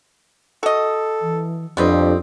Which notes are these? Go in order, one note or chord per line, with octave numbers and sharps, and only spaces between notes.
F#4 A4 D#5
E3
F2 G3 B3 C4 D4 D#5